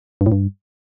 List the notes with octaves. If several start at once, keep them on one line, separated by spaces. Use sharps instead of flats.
G2
A2
G2